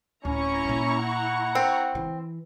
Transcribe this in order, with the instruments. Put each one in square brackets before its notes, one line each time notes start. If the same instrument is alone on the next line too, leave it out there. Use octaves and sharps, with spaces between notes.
[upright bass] D1 [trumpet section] C#4 [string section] E4 A#5 C#6
[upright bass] A#2 A#3
[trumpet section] F#5
[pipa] C4
[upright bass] E3